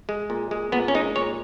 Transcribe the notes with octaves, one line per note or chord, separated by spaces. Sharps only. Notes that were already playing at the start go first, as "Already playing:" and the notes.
G#3
A#2
G#3
A#2 B3
C#4
G#3 D#4
A#2 C#5